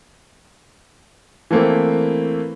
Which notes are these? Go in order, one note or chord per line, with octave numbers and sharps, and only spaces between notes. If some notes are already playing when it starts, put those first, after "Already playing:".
E3 A3 A#3 C4 E4